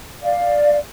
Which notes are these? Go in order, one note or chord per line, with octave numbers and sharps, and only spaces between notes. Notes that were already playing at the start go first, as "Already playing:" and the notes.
D5 F5